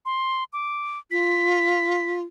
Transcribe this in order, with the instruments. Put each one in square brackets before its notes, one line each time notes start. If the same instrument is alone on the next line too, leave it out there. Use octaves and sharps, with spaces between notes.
[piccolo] C6
D6
[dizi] F4 [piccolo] B6